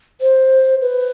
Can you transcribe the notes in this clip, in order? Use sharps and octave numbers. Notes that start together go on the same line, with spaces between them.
C5
B4